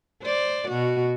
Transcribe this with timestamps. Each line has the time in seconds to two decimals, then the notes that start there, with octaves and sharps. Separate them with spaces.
0.23 C5 D5
0.68 B2 F#4